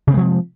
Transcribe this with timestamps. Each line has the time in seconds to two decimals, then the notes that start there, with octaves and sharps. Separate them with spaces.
0.07 C3
0.11 C4
0.14 G#3
0.17 F3